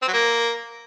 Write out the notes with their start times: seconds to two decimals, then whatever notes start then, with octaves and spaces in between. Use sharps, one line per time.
0.02 C4
0.08 F#3
0.13 A#3